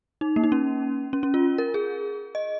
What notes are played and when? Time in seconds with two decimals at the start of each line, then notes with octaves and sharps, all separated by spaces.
0.21 D#4
0.36 A#3
0.44 D#4
0.52 C#4
1.13 C#4
1.23 C#4
1.34 F4
1.58 A#4
1.74 G#4
2.35 D#5